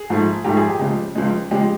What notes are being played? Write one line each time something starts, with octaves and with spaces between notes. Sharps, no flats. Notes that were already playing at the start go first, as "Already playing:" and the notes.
Already playing: G#4
G#2 F3 A3
G#2 F3 A3 G4
G#4
G4
C#2 C#3 F3 G#3
C#2 C#3 F3 G#3
C#3 F3 G#3 G4